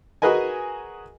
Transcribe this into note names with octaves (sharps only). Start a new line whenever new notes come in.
F#4 G#4 A#4 B4 D#5 G#5